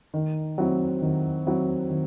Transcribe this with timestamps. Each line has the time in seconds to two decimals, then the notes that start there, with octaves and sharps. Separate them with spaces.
0.14 D#3
0.58 F#3 C4 E4
1.02 D#3
1.47 F#3 C4 E4
1.90 D#3